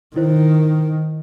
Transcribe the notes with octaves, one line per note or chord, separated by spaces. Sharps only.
D#3 E4 C5